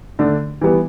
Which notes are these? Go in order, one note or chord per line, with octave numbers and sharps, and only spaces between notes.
D3 A3 D4
E3 G3 B3